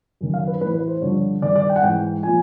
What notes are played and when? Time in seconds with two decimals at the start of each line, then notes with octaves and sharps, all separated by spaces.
0.21 F#2 D#3
0.34 F5
0.47 B4
0.61 A2 B4
0.65 E3
0.74 B4
0.88 C5
1.01 G2 D3 F3 C#5
1.42 G2 D#3 D5
1.56 D5
1.70 G5
1.76 F#5
1.83 G#2 E3 G5
2.23 A#2 F3 G#5